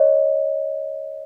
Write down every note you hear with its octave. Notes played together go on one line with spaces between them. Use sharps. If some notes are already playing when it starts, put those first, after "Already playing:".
Already playing: C#5 D#5